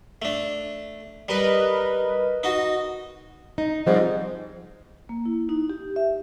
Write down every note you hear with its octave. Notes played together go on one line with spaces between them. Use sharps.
A3 D4
G3 A#4 B4 D#5
D#4 F#4
D#4
G#2 F3 G3 C4
A#3
E4
D#4
G4
E5